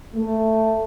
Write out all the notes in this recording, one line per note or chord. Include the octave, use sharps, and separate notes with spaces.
A3